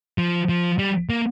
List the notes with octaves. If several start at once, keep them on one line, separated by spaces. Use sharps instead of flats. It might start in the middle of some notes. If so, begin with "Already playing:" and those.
F3
F3
G3
A#3